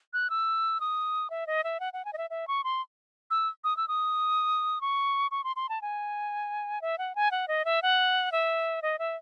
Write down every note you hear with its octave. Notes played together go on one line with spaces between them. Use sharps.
F#6
E6
D#6
E5
D#5
E5
F#5
F#5
G#5
D#5
E5
E5
C#6
C6
E6
D#6
E6
D#6
C#6
C#6
C6
C6
A5
G#5
E5
F#5
G#5
F#5
D#5
E5
F#5
E5
D#5
E5